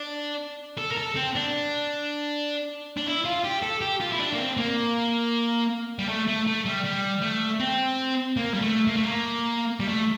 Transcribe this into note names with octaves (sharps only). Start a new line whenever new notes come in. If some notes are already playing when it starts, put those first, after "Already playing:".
Already playing: D4
A4
A#4
A4
C4
D4
D4
E4
F4
G4
A4
G4
F4
E4
D4
A#3
C4
A#3
G3
A3
A3
A3
G3
G3
A3
C4
A#3
G3
A3
A#3
A3
A#3
G3
A3